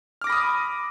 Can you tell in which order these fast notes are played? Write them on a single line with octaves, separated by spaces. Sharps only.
F6 D6 A#6 B5 D#6